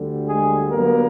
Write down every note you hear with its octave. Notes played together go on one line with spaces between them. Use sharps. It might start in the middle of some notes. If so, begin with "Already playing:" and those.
Already playing: D2 D3 G3
G#3 G#4
G2 D3 F#3 A#3 B3 A#4